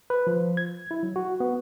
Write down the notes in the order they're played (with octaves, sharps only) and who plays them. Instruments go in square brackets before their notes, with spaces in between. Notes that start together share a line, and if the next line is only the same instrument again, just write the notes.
[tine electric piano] B4
F3
G#6
E4
F#3
F#4
B3